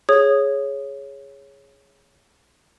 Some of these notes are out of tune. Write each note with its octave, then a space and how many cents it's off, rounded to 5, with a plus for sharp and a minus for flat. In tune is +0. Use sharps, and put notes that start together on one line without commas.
G#4 +0 C#5 +0 D#6 -15